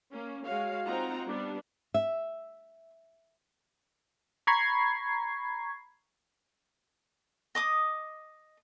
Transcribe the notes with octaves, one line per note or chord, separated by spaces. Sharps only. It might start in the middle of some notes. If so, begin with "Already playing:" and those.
A#3 C#4
G#3 F#4 C#5 F5
C4 D#4 F4 F#5 A#5
G3 B3 D4
E5
A#5 B5 C#6 G#6 C7
D#5 D6 D#6